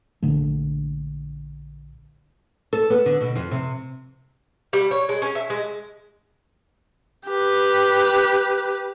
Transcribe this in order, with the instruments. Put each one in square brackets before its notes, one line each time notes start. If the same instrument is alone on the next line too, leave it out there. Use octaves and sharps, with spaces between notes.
[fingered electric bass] A#1 D3 A3
[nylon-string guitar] A4
B3
D3
B2
F2
C3
[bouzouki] G3
C#5
G#3
C#4
E5
G#3
[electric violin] G4 B4